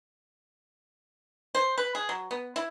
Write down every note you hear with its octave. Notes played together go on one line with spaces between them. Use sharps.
C5
B4
G#4
F#3
B3
E4